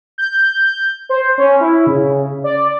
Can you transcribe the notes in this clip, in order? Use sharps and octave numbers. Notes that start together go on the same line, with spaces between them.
G6
C5
C#4
E4
C#3
D5